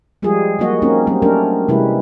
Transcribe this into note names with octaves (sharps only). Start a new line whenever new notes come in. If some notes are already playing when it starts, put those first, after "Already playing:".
F3 G3 G#3 F4 G#4
F#3 G3 A#3 F#4 D#5
A#3 C4 C#4 D#4
F#3 G3 C4 C#4
F#3 A3 C#4 D4 A#4
C3 E3 G3 G#3 E4 B4